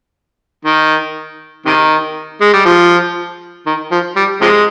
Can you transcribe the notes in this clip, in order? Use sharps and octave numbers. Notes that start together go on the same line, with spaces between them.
D#3
C3 D#3
G#3
G3
F3
D#3
F3
G3
C3 F3 G#3